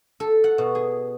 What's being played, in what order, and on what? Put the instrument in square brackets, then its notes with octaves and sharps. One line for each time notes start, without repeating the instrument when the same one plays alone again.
[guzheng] A4
F#5
B2
G#4